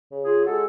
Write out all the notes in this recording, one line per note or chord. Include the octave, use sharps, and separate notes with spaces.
C#3
F4 G#4
G#3 F#4 A4